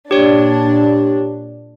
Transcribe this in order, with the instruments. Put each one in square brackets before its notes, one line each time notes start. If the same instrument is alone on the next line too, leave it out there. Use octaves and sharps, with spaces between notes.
[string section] A#2 D4 [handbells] G4 C#5